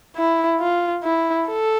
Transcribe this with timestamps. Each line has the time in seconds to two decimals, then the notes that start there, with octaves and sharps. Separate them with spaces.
0.16 E4
0.59 F4
1.03 E4
1.48 A4